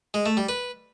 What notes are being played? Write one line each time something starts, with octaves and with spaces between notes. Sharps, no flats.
G#3
A3
G3
B4